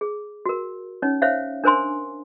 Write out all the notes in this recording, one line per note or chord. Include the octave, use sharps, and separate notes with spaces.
G#4
F#4 A#4
C#4 D#4 C#5
C5 C#5 E5 F5
D4 A#4 C5 G#5 C6